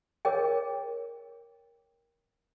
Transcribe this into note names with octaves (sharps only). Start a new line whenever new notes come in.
G#4 A#4 C#5 D#5 G5